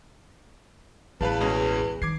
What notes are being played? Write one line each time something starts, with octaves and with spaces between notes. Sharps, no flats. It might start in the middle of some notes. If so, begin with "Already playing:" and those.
A1 E2 B4 F5 A5
B2 G#3 C#4
D#3 D6 G#6 C7